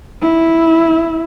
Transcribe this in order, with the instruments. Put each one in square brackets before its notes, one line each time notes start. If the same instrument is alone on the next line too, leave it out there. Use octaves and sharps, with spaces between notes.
[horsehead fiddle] E4